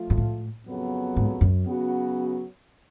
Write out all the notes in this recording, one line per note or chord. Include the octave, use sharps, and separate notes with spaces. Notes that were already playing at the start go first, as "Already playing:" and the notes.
Already playing: F3 A3 F4
G#2
A2
F2 C#3 F#3 B3
G#2
F#2
C#3 F#3 B3 F#4